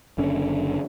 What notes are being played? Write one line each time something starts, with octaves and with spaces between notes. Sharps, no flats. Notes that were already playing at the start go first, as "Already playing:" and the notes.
F#1 D3 C#4